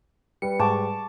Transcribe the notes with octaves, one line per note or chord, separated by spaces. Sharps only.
G3 B4 C#7
G#2 A5 C#6 D6